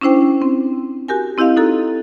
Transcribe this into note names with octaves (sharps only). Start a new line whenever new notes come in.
C#4 D4 E4 C5 G5
C4
F#4 G4 A#4 G#5
C4 E4 G4 D#5 F5
D#4 F#4 A4 A#5